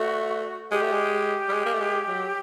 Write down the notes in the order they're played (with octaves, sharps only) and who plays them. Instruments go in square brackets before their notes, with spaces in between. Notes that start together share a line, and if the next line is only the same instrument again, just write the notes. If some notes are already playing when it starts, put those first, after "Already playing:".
Already playing: [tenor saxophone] A3 [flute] F#4
[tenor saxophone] G#3 [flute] G4
[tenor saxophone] A3
G#3
G3
G#3
A#3
A3
G#3
F#3